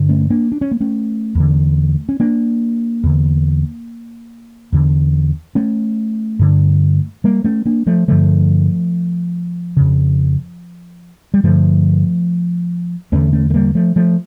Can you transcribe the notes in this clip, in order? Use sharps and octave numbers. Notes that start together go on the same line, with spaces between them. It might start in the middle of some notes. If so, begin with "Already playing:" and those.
Already playing: G2 D3
A3 C#4
A#3 D4
D4
C#4
A#3
A3 C#4
E2 D3
C#4
A#3 D4
E2 D3
E2 D3
A3 C#4
G2 D3
G3 A#3
A3 C#4
A#3 D4
F3 A3
G2 D3 F3 A3
F2 C#3
G3
G2 D3 F3 A3
E2 D3 A3 C#4
A3 C#4
A3
G3 A#3
F3 A3
F3 A3